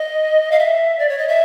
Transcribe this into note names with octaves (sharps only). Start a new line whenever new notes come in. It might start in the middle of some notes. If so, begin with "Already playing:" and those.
Already playing: D#5
F5
E5
D5
C#5
D#5
E5